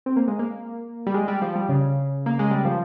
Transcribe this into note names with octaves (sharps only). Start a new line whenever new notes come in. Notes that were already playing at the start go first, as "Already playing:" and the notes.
C4
A#3
G#3
A#3
G3
G#3
G3
F3
G3
C#3
A#3
G#3
G3
F3